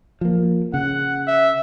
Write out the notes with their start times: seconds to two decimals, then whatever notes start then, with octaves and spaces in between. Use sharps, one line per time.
0.21 F3 A#3
0.74 C#3 F#5
1.27 E5